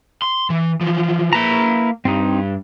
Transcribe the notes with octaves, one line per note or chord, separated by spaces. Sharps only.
C6
E3
E3 F3
A#3 E4 B4 A5 A#5
G2 C4 D#4